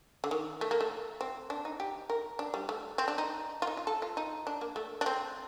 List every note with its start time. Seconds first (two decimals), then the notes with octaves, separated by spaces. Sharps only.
0.24 D3
0.31 D#3
0.61 A3
0.71 A#3
0.81 A3
1.21 C4
1.50 D4
1.65 D#4
1.80 G4
2.10 A#4
2.39 D4
2.54 G3
2.69 A3
2.98 C4
3.08 D4
3.18 D#4
3.62 F4
3.67 D#4
3.77 F4
3.87 A4
4.02 F4
4.17 D#4
4.47 D4
4.61 A#3
4.76 A3
5.01 D4
5.06 C4